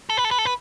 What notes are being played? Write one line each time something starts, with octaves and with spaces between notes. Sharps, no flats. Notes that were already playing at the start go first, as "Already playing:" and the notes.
A4
B4
A4
B4
A4
B4